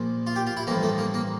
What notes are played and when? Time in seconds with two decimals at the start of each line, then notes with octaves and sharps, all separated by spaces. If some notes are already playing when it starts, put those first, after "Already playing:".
Already playing: A#1 A#2 F3
0.27 F4
0.36 G4
0.47 F4
0.57 E4
0.67 A1 G2 F3 A#3
0.83 A3
0.98 A#3
1.14 A#3